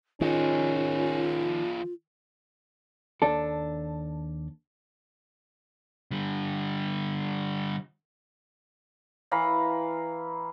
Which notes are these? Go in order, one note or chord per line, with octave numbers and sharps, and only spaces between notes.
D#3 F3 C#4 F4 G#4
D#2 D4 A4
D3 G3
E3 F5 A#5 B5